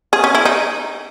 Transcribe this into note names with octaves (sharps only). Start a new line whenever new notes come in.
G#4
C#4
E4
D#4